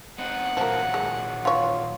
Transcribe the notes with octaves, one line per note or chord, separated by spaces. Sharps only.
B3 C4 D#4 F#5
A#2 D#3 F3 F#3 A#4
G#3
F4 C#5 F5 C6